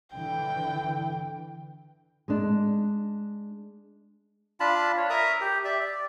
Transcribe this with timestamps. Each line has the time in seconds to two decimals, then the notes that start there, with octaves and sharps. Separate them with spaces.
0.14 D3 E3 G5
2.28 G#3 D4
4.60 D4 F4 A5 B5
4.97 C#5
5.10 A#4 E5 A#5 D#6
5.41 G4
5.65 D5 E5
5.80 D5